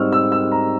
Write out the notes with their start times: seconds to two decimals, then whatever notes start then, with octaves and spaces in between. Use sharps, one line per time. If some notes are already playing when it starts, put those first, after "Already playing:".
Already playing: G#2 G3 C4 C#6 E6 F6
0.12 E6
0.32 E6
0.52 A#5